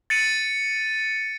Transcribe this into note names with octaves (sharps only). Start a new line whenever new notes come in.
A6 C#7 D#7